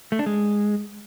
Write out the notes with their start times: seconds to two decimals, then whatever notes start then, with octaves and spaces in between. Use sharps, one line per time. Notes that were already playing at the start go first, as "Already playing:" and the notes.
0.12 A3
0.19 D4
0.26 G#3